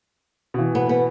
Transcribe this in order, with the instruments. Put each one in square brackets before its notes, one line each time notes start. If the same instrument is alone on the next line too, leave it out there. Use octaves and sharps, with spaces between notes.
[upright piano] B2 E3
[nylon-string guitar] B3
B3